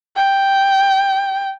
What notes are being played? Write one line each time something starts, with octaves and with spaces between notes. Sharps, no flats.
G5